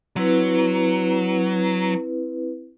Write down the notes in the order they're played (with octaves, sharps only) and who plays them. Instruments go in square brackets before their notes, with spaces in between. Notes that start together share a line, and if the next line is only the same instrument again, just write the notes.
[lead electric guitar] F#3 [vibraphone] C4 E4 B4